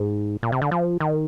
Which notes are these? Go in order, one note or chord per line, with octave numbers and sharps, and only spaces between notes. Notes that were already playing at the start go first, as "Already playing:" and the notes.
Already playing: G#2
A#2
C3
D3
F3
D#3